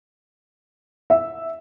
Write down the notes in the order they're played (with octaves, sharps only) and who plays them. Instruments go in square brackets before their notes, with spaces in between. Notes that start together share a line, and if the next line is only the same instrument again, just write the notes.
[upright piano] E5